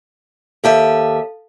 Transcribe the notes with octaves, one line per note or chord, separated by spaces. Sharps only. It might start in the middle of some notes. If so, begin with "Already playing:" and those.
D#2 G4 A4 E5 F5 A5